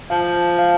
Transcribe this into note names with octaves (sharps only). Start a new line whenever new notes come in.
F3 F5
F5